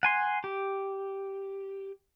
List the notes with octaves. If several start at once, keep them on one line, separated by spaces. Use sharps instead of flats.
F#5 G#5 C6
G4